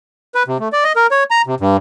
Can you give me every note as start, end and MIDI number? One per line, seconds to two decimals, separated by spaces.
0.35 0.43 71
0.48 0.58 48
0.60 0.68 57
0.72 0.84 74
0.84 0.92 75
0.96 1.07 70
1.11 1.24 73
1.31 1.42 82
1.46 1.55 48
1.60 1.77 43